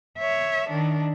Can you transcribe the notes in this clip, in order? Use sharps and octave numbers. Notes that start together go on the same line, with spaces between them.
C#5 E5
D#3 D4